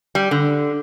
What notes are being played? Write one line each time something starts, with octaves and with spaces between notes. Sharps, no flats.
G3
D3